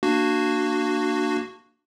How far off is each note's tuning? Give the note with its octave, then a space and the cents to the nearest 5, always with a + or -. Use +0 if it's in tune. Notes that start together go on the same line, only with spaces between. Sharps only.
A#3 +0 D4 +20 F#4 +0